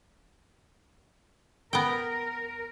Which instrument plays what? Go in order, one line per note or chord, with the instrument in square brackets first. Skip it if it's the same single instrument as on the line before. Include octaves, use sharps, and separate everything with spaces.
[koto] B3 G5 [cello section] A#4